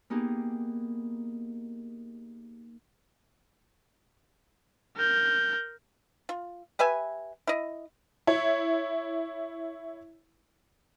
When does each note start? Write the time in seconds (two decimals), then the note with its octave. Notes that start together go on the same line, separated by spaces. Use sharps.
0.10 A#3 B3 D#4 G4 G#4
4.96 A#4 G6
6.29 F4
6.79 G4 B4 E5 G#5
7.47 E4 D#5
8.27 E4 C#5